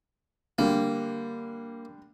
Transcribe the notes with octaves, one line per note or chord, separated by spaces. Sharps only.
D3 G3 A#3